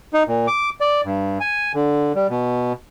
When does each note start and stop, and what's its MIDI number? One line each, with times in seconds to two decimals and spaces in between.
0.13 0.23 63
0.28 0.47 46
0.47 0.70 86
0.81 1.01 74
1.05 1.38 43
1.40 1.72 80
1.74 2.12 50
2.15 2.27 55
2.30 2.73 47